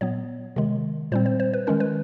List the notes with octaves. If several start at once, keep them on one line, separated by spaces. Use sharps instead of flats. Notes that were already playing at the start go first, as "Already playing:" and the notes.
A#2 F#3 B3 C#5
C3 D#3 G#3
A#2 G3 C4 C5
C5
C5
B4
D#3 G#3 C#4 A#4
B4